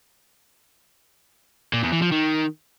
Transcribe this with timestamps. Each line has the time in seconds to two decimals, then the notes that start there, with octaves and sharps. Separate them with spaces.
1.73 A#2
1.83 E2
1.93 E3
2.02 F3
2.12 D#3